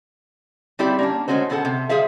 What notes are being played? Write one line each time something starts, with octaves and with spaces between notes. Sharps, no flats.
G3 C4 E4 G4 D5
A#3 C#4 D4
G#3 A3 C#4 F#4 C5
B2 B3 G#4 A4 C5 F#5
C3
G3 G#4 C5 E5 F5